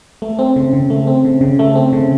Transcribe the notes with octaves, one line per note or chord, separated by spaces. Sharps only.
A3
C4
C#3
C#3
A3
C4
C#3
C#3
A3
C4
C#3